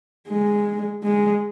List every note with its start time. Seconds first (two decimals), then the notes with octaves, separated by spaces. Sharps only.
0.28 G#3
1.03 G#3